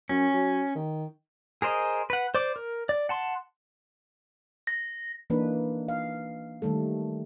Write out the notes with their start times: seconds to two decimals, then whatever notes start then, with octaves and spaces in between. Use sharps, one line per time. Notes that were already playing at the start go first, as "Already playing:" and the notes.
0.09 F#2 C#4
0.33 F#3
0.75 D#3
1.62 G#4 A#4 C5 D#5
2.10 B4 F#5
2.34 C5 D5 D6
2.56 A#4
2.89 D5
3.09 F#5 A5 C6
4.67 A#6
5.30 E3 A#3 D4 D#4 B4
5.88 F5
6.62 D#3 G3 A3 A4